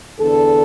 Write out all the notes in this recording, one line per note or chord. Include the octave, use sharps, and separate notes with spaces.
E2 D3 A4